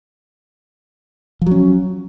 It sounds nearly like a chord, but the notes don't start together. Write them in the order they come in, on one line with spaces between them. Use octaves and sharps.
F3 F#3 C#4